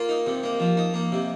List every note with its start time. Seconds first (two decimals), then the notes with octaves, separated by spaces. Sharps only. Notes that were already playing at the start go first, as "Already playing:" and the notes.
Already playing: A#3 F4
0.09 D#4
0.27 C3
0.43 A#3
0.60 F3
0.77 D#4
0.94 A#3
1.12 C3